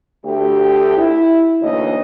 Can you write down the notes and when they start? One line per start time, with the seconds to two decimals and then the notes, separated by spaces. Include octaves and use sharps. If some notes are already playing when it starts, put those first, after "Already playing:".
0.25 D2 A3 G4
0.97 E4
1.61 D2 E3 A#3 D#4 C#5 D#5